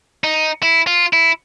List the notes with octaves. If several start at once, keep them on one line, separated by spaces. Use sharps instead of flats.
D#4
E4
F4
E4